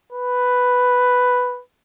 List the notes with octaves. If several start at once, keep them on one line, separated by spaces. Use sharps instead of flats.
B4